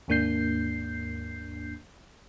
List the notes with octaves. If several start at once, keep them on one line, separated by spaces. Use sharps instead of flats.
D#2 G#2 A#3 D4 G6 C7